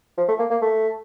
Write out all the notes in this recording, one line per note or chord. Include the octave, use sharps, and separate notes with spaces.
F3
A3
A#3
A#3
A3